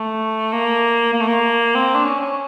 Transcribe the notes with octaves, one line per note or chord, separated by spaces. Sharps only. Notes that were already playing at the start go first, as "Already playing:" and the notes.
Already playing: A3
A#3
A#3
A3
A#3
C4
D4
C#4
C#4